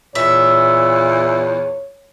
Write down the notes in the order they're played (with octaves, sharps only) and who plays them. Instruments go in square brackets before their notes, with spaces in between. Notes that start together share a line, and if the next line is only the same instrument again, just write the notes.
[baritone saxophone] E2 [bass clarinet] A#2 [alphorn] C#5 [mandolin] E5